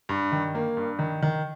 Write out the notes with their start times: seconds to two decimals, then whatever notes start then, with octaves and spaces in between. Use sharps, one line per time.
0.09 G2
0.32 D#3
0.55 A#3
0.77 G2
0.99 D#3
1.22 D#3